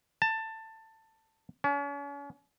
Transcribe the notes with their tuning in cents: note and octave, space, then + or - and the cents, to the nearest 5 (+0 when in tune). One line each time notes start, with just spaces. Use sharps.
A5 +15
C#4 +40